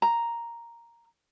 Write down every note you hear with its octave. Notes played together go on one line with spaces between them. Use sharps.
A#5